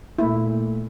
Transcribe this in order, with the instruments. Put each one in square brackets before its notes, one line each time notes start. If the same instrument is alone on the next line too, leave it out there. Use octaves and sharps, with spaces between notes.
[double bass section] A#2 [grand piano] A3 A#3 [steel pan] E4